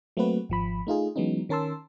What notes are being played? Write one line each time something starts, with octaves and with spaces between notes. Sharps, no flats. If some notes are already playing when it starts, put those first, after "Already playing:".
F#3 A3 A#3 C4 F#4 B4
G#1 F3 B5
A3 D#4 F4 G#4
E3 F#3 G#3 B3 C#4 D#4
D#3 C#4 A#4 A5 C6 E6